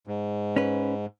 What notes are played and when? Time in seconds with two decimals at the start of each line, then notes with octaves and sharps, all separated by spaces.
0.07 G#2
0.56 C#4 B4